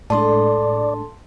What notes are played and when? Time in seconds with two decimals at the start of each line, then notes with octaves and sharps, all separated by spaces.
0.10 A2 G#3 D4 A4 D5 D#5 A5 C6